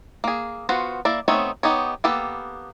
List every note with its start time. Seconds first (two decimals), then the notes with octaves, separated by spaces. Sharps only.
0.24 A#3 G#4
0.69 B3 F4 F#4 B4 C5
1.05 A#3 E4 D5
1.28 A3 B3 C4 D#4 C#5
1.63 B3 D#4 G4 C#5
2.04 A#3 B3 G4 A4 B4